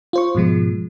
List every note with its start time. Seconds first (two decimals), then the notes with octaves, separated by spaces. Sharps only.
0.13 F4 C5 C#6
0.35 G#2 B2 F3 G#3